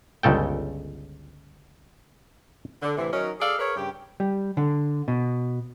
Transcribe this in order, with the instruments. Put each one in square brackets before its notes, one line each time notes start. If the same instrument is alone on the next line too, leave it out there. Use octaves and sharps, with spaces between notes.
[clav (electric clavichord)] G1 C#2 C#3 A4 G5
[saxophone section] D3
A2 C3 E3
D#3 F#3 C#4 D#4 A#4
G#4 A4 D5 F5
G#4 A#4 B4 C#5
G2 C#3 G4
[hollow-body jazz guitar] G3
D3
B2